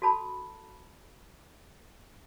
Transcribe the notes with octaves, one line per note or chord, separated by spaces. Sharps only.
F#4 A4 A5 B5